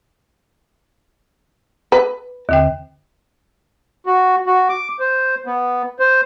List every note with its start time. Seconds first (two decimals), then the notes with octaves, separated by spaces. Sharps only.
1.92 B4
2.49 D#2 D3 G5
4.06 F#4
4.46 F#4
4.69 D6
4.99 C5
5.46 B3
5.99 C5